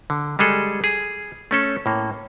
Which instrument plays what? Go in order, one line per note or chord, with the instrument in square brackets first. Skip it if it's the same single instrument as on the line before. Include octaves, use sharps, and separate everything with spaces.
[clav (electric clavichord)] D3
G3 G#3 G#4 A4
G#4
A3 C#4 A4
A2 A#3